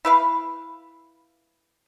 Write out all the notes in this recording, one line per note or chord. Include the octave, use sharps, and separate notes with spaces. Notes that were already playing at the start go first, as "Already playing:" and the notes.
E4 B4 F5